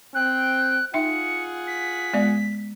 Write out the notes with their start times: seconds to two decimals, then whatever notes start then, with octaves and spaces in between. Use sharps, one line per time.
0.14 C4 G5 F#6
0.94 D#4 F4 G#4 E5 F#5 G5 C#7
1.67 B6
2.13 G#3 B3 D5